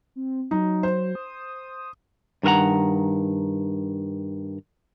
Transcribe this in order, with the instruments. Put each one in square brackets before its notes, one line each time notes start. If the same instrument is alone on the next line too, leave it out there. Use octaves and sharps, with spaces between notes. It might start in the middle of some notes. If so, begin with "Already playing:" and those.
[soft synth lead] C4
[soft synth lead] F#3 [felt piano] D#4
[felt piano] C5
[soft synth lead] D#6
[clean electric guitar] G2 D#3 A#4 F#5 A#5